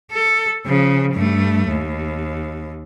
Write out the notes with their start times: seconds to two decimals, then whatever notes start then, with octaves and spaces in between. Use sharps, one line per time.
0.11 A4
0.65 C#3 F3
1.13 G2 A3
1.68 D#2